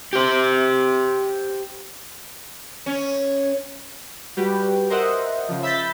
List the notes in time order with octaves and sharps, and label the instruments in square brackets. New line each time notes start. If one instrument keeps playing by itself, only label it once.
[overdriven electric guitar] G4 C5
[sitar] C#4
[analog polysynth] G3 F#4 G4 B4
A#4 C5 D#5 E5 F#5
C#3 F3
E5 B5 E6 G6 A6 B6